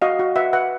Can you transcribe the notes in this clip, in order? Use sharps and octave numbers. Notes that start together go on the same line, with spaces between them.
F#4 D#5 F5
F#4
B4 E5 F#5
B4 E5 F#5